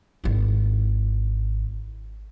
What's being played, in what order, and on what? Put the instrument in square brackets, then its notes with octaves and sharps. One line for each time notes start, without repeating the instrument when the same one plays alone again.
[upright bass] G#1 E4